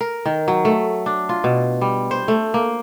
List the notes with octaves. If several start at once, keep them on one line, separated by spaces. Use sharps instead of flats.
A#4
D#3
F#3
A3
D4
F4
B2
G3
C5
A3
A#3